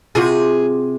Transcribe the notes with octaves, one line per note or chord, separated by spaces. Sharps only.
C3 F4 F#4 G#4